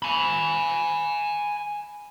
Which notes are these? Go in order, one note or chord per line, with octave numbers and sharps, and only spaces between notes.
G#5 B5